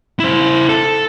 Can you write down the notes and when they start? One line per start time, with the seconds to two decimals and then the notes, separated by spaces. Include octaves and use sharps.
0.20 E4 C5
0.69 A4